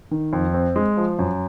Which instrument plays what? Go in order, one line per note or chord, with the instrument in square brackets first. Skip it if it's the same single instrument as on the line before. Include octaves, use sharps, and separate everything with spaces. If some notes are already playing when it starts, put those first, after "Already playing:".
[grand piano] D#3
F2
C4
G#3
F3
F#2